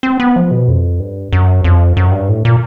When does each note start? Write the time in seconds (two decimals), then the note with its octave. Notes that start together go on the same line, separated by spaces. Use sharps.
0.03 C4
0.20 B3
0.36 F3
0.51 B2
0.68 F2
1.00 G2
1.33 F#2
1.64 F2
1.97 F#2
2.12 G2
2.29 A2
2.45 A#2